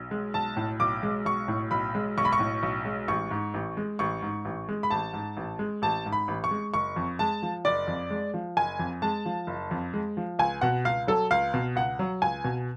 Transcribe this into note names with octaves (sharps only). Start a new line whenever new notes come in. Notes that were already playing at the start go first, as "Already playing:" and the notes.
Already playing: B1
G#3
B1 A5
A2
B1 D6
G#3
B1 C#6
A2
B1 B5
G#3
B1 C#6
B5
C#6
A2
B1
G#3
A1 C#6
G#2
A1
G#3
A1 C#6
G#2
A1
G#3
B5
A1 A5
G#2
A1
G#3
A1 A5
G#2
B5
A1
C#6
G#3
F#1 C#6
F2
G#3 A5
F3
F#1 D5
F2
G#3
F3
F#1 G#5
F2
G#3 A5
F3
F#1
F2
G#3
F3
C#2 G#5
B2 F#5
C#2 F5
F#3 A4
C#2 F5
B2
C#2 F#5
F#3
C#2 G#5
B2